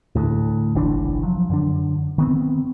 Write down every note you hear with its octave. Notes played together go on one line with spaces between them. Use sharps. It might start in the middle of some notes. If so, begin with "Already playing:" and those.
D2 A2
F#1 B1 E3 D4
F3 F#3
F#2 D3 D4
D#3 B3 C4